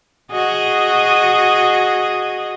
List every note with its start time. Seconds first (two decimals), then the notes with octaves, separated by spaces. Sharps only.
0.32 F#4 G#4 D#5